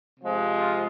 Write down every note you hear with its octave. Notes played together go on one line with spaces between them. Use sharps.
C3 F3 G#3
F4